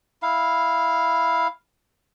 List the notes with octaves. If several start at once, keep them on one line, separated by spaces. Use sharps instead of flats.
E4 F5